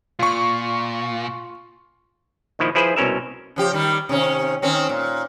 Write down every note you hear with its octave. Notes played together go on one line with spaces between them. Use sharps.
A#2 F4 C#6
A#2 D#3 F3 E4
F3 E4 G#4 B4 C5
C2 B2 C#4 A#4 E5
C#3 F3 G4
D#3 G3
C3 D#3 C#4
D#3 C4 C#4
A#2